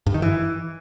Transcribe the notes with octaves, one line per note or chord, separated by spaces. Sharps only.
G2
D#3
E3